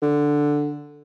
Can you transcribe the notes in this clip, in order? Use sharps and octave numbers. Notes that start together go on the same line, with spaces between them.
D3